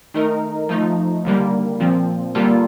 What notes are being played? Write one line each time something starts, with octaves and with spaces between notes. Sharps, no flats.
D#3 A3 D#4 A#4
F3 A3 D#4
D#2 D3 G3 A#3
A#2 F3 C4
D3 G3 A#3 F4 A4